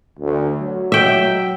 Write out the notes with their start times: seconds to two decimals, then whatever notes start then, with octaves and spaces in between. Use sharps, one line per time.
0.19 D2
0.60 F#3
0.92 E5 G5